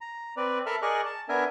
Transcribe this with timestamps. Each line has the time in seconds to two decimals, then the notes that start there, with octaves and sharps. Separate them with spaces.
0.01 A#5
0.37 C4 B4 D5
0.66 A4 A#4 E5 A5 B5 F6
0.82 G#4 A#4 D5 D#5 C#6 F#6
1.06 A5
1.29 B3 D4 A#4 E5 G#5